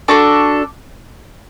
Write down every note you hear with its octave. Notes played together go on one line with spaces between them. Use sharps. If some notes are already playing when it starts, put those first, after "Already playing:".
D4 F#4 A4 D6